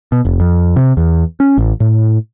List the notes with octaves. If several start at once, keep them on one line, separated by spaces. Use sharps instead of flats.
B2
F1
F2
C3
E2
C#4
A1
A2